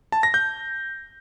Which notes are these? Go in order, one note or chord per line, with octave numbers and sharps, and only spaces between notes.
A5
A#6
G6